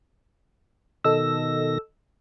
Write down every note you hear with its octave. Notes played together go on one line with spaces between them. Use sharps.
B2 D#3 A4 D#5 E6 A#6